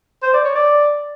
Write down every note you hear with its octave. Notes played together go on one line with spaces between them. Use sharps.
C5
D5
C#5
D5